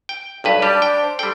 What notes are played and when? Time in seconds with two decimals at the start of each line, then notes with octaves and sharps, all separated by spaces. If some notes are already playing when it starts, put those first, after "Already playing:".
0.09 G5
0.44 B1 G2 B4
0.62 G3 D4 G4 A5
0.82 G5
1.02 C5
1.19 G3 A4 G5 C6